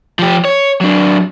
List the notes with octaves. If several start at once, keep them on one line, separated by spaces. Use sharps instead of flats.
F3 G4
C#5
F#3 D4